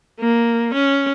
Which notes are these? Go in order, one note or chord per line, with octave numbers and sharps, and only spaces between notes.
A#3
C#4